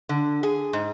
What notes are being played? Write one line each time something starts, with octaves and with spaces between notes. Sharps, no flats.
D3
G#4
G#2